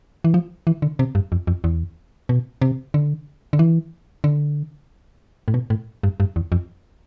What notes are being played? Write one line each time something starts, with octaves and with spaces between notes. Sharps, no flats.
E3
F3
E3
D3
C3
G2
F2
F2
E2
B2
C3
D3
D3
E3
D3
A2
B2
A2
G2
G2
E2
F2